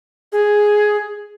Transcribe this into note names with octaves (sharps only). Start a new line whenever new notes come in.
G#4